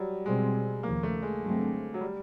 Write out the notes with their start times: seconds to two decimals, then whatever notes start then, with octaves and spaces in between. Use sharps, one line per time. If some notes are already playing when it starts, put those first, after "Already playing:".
Already playing: F#3 G3
0.25 B2 G3 G#3 C4
0.83 D#2 C#3 F3 A#3
1.03 A3
1.22 G#3
1.42 G2 D3 F#3 A3 C4
1.94 F#3
2.01 G3